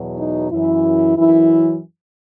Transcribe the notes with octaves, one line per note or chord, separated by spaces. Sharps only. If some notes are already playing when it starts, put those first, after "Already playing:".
Already playing: E2 B2 F#3
D#4
F#2 E3 E4
F#2 E3 E4